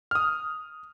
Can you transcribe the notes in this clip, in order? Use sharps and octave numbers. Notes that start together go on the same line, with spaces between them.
D#6 F6